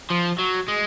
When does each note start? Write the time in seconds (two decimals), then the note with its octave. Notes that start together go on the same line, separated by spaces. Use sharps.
0.10 F3
0.38 F#3
0.68 G#3